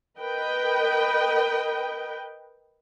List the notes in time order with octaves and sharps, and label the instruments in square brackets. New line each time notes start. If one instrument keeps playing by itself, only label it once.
[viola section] A#4 B4 D#5 G5